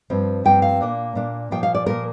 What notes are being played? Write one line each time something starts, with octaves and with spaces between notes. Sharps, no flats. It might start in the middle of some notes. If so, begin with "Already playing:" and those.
G2 F3 C4
G2 F3 C4 G5
F5
A#2 A#3 D4
A#2 A#3 D4
A#2 F3 A#3 G5
F5
D5
A#2 F3 A#3 A#4